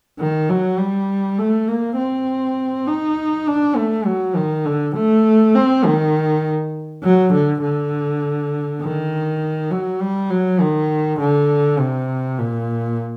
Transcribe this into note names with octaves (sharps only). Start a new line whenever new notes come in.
D#3
F#3
G3
A3
A#3
C4
D#4
D4
A3
F#3
D#3
D3
A3
C4
D#3
F#3
D3
D3
D#3
F#3
G3
F#3
D#3
D3
C3
A#2